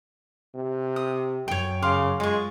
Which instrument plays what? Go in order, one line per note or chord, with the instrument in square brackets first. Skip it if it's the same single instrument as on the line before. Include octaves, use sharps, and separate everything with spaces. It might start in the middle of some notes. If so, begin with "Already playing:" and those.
[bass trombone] C3
[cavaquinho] D#6
[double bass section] F#2 [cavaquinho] C#5 G5
[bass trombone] C#3 [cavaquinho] F5 C6 D6
[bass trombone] G#3 [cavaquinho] F4 C#6